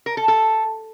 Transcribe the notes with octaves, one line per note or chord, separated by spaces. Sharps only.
A#4
A4
A4